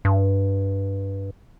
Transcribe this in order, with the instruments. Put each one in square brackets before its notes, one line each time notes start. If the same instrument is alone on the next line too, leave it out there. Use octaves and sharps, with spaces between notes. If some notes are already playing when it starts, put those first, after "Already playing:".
[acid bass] G2